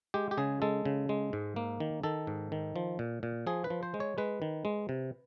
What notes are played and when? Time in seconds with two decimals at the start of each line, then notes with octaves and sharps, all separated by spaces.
0.14 G#3 G4
0.31 G4
0.37 C#3 G#4
0.62 G#3 A4
0.85 C#3
1.09 G#3
1.33 G#2
1.56 A#3
1.80 D#3
2.04 D#3 A4
2.27 G#2
2.52 D#3
2.76 F3
2.99 A#2
3.23 A#2
3.47 F3 G#4
3.64 B4
3.70 F3
3.83 C5
3.94 G#3
4.00 C#5
4.18 G#3 B4
4.42 D#3
4.65 G#3
4.89 C3